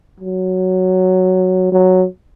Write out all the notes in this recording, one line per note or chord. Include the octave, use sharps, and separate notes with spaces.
F#3
F#3